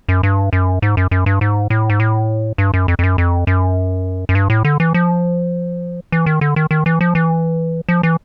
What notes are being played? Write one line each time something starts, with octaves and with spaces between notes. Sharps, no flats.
F#2
G2
F#2
G#2
F#2
F#2
G2
G#2
A2
G#2
A2
G2
F#2
F2
F2
F#2
F2
F#2
F#2
G2
A2
D3
E3
F3
E3
D#3
D3
D#3
D#3
E3
F3
E3
F3
E3